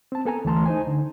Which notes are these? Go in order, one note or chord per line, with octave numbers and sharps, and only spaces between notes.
C4 A5
B3 A4 G#5 A#5
D2 E3 A3 A5 A#5 C6
D#4 C5 G#5
D3